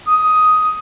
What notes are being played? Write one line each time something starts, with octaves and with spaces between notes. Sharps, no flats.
D#6